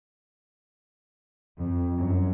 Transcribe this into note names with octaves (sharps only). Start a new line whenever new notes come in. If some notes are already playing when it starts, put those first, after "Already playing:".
F2
F#2